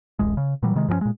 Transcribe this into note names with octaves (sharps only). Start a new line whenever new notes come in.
D1 A1 G#3
C#3
A#2 E3 F#3 G3
C3 D#3 G#3
G2 F3 F#3 C#4
A#2 G#3